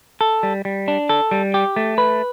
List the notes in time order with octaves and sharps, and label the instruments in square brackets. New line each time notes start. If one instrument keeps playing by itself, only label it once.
[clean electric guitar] A4
G3
G3
D4
A4
G3
G4
A3
B4